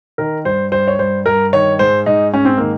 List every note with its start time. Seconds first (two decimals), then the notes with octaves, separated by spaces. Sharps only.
0.18 D#3 A#4
0.45 G2 C5
0.72 G2 C5
0.88 C#5
0.99 G2 C5
1.26 G2 A#4
1.53 D#3 C#5
1.79 G#2 C5
2.06 G#2 D#4
2.34 G#2 C#4
2.45 C4
2.58 D#3 A#3